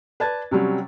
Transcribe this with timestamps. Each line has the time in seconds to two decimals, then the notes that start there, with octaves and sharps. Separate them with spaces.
0.20 B4 D5 A5 G#6 A6
0.51 C3 F#3 G3 C#4